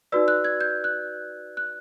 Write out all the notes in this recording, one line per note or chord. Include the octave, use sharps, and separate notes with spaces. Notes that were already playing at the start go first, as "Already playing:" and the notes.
D#4 F#4 B4 D5 E6
F#6
G#6
G6
F#6
F#6